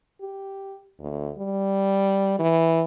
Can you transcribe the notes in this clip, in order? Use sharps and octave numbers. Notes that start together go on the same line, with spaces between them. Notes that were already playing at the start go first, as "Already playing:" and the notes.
G4
D2
G3
E3